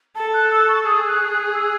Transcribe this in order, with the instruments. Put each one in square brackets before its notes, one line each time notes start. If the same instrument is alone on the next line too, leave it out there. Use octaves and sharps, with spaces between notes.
[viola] A4 [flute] A5
[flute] F#6
E6
C#6
[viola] G#4 [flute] D#6
[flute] F#6
F#6
E6